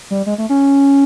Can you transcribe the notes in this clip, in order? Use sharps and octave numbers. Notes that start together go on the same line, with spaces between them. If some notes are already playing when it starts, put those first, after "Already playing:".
G3
G#3
A3
C#4